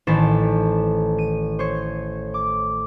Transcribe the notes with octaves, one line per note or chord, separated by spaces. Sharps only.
A1 D#3 C5 A5 B6
D#7
C5 C#5
D6